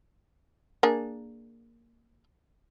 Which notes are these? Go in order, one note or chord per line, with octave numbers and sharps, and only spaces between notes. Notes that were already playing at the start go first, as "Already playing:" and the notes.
A#3 D4 G#4